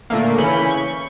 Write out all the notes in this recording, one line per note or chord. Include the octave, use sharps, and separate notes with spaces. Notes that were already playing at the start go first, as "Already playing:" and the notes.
A#2 D3 A3 A#3
C#3 E3 C#4 B5 G6 C#7
C#6